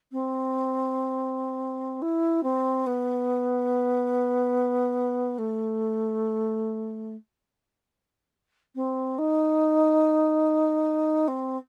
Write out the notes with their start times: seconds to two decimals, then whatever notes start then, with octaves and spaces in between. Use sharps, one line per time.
0.12 C4
2.02 E4
2.43 C4
2.86 B3
5.38 A3
8.75 C4
9.18 D#4
11.28 C4